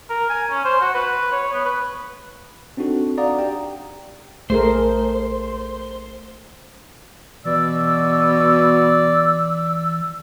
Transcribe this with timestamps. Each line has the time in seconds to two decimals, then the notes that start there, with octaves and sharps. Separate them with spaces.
0.10 A#4
0.29 G#5
0.50 C#4
0.64 C5
0.81 F#4
0.95 B4
1.32 C#5
1.52 B3
1.65 B4
2.77 C4 D4 D#4 F#4 A4
3.18 D5 F5 F#5 A#5 D#6
3.39 G4 G5
4.50 A#1 A3 G#4 A#4 C5
7.45 B2 E3 D5 E6